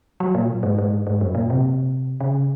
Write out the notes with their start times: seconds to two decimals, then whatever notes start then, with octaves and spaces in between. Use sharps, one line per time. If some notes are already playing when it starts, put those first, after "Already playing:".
0.20 F#3
0.35 A#2
0.63 G#2
0.78 G#2
1.07 G#2
1.21 F#2
1.35 A#2
1.50 C3
2.20 C#3